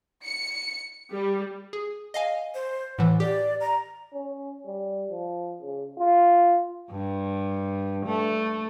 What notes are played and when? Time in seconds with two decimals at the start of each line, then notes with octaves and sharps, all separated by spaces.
0.24 C#7
1.12 G3
1.73 G#4
2.14 D#5 F5 G#5
2.55 C5
2.98 A2 E3 F#5
3.20 G4 D5
3.61 A#5
4.13 C#4
4.66 G3
5.10 F3
5.62 C#3
5.98 F4
6.91 G2
8.06 A3